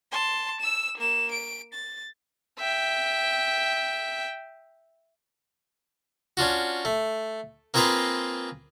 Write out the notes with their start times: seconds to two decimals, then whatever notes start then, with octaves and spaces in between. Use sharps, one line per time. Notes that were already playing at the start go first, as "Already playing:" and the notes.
0.12 A5 C6
0.61 E6 E7
0.97 A#3 E7
1.31 D7
1.73 A6
2.59 E5 G5
6.37 C#4 D4 F4 F#4
6.85 A3
7.74 A#3 C4 F4 G#4 B4 A#5